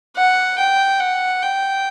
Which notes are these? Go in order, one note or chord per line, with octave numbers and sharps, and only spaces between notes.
F#5
G5
F#5
G5